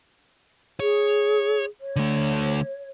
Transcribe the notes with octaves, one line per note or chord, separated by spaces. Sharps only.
G#4 C#5
C#5
D3 A3